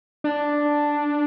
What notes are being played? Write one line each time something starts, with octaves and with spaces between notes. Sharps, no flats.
D4